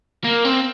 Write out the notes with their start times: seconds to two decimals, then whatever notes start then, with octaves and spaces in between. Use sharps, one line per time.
0.24 A#3
0.44 C4